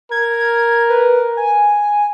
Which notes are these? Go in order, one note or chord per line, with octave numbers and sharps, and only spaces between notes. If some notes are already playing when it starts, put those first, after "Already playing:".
A#4 G#6
B4
G#5